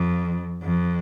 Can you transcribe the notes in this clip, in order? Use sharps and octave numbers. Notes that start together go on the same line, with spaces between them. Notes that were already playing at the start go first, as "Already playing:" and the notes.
Already playing: F2
F2